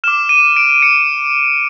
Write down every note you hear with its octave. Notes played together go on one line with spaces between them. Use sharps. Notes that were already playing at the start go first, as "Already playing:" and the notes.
D6 F6 E7
D#7
D7
C#7